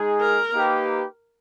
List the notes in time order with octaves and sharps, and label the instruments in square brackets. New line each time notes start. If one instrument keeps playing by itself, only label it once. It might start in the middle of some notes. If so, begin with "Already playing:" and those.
Already playing: [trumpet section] G#3 D#4 G#4
[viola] A#4
[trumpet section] A#3 D#4 G4 B4